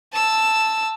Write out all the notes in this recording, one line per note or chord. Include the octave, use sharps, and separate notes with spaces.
A5 E6